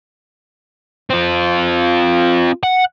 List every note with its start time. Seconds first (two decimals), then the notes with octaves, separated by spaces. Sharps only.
1.10 C4 F4
2.63 F#5